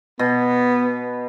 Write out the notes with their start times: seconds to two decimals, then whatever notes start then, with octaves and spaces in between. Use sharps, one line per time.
0.19 B2 B3